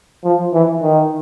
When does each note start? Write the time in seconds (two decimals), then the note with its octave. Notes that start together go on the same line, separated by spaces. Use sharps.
0.24 F3
0.54 E3
0.82 D#3